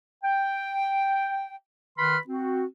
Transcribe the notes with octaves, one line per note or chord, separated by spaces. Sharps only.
G5
D#3 B4 B5 C6 F6
C4 F#4